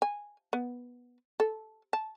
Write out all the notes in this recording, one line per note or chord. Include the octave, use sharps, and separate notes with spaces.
G#5
B3
A4
A5